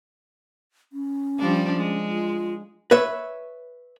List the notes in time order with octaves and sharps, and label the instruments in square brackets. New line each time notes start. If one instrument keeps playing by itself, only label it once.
[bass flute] C#4
[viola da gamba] F3 G3 D4
G#3
[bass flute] F4
[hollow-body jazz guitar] B4 C#5 E5